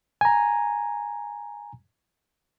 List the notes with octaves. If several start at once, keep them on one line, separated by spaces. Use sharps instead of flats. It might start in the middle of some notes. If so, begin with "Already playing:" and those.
G#5 A#5